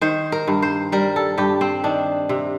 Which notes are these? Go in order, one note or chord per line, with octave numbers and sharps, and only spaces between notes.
D#3 C5
A#4
G2
C5
G3 A#4
A4
G2 G4
C4
D#3 D4
C3